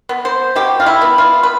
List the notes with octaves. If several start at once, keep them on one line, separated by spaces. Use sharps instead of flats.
B3
C5
B2 G4
F4
E4
B3
F4
B4